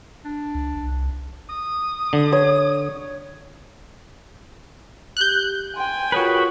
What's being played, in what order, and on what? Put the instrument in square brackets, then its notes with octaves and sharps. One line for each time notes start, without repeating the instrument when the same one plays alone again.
[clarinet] D4
[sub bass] C#2
C2
[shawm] D#6
[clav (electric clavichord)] D3
[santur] C#5
[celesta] G4 F#7 [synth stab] F#6 G6
[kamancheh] G5 G#5 [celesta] C6
[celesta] F4 A#4 C#5 [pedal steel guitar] F#4 G#4 B4